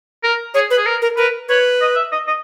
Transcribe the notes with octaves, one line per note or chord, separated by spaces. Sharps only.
A#4
G#4 C#5
B4
G#4
A#4
A#4
A#4 B4
B4 C#5
D#5
E5
D#5
D#5